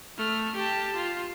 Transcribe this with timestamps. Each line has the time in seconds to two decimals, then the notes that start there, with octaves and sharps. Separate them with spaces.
0.18 A3 F6
0.56 G4 A5
0.96 F4